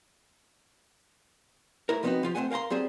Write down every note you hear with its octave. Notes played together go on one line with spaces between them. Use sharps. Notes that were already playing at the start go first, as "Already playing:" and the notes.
A2 E4 A#4
F3 G3 B3 C4 D#4 F#4
F3 F4 G4
A3 C4 C5 F#5 G#5
A#4 F5 G5 A#5 C6
F#3 G3 C4 G#4 C5